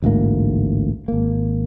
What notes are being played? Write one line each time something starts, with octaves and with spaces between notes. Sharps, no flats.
A1 D2 G#2 A#3
G#1 A#3